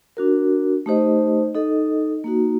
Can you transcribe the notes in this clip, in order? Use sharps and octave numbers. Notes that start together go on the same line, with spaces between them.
D4 F#4 A#4
A3 D#4 G4 C5 D#5
D#4 A4 D#5
A#3 D#4 F#4